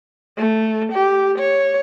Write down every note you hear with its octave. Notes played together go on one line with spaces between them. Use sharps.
A3
G4
C#5